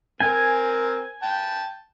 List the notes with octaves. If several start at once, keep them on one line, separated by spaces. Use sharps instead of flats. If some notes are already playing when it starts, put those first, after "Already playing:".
C4 A#4 G#5
G5 A5